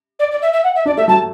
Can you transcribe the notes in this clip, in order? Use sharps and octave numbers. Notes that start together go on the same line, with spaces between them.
D5
D5
E5
E5
F#5
E5
D4 D5
A3 E5
F#3 A5